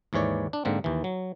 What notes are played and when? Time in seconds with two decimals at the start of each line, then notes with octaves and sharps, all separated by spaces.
0.13 D#2 G#2 E3 C#5 D5
0.53 D4
0.65 G#2 D3 A#3 C4
0.84 D#2 E3
1.04 F#3